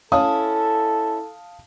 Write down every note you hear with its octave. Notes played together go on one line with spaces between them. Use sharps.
C#4 E4 A4 F5 A5 D#6